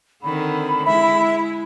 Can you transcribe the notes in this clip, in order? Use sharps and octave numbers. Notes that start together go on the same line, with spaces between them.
D3 D#3 C4 B5
G#3 E4 E5